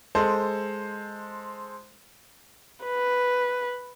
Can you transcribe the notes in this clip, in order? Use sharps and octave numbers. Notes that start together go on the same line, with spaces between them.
G#3 A4 C5
B4